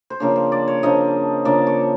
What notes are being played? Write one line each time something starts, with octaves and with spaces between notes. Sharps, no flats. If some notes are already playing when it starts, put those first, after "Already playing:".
C5
C#3 F3 A#3 D4 C#5
C5
D5
C#5
C#3 F3 A#3 D4 D#5
C#3 F3 A#3 D4 D5
C#5